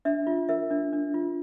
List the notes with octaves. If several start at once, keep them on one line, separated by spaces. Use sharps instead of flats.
D4 E5
F4
A#4 E5
D4
D4
F4